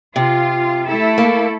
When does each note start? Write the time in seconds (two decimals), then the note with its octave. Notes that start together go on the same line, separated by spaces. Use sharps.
0.16 C3 F4
0.86 A3 E4 A4
1.18 A#3